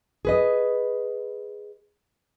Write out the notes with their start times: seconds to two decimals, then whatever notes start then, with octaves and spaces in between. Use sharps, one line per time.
0.25 G#4 B4 D#5